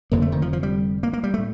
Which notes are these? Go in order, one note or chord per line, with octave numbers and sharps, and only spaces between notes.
F1 F2 D3 A#3
A3
D#3
F3
F3
G3
A#3
A#3
G3
A3
A2